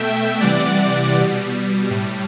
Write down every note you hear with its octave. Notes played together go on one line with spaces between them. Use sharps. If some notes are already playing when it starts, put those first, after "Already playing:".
Already playing: B2 A3 E5 G5
C3 E3 G3 D5 F#5
B2 G3
A2 G3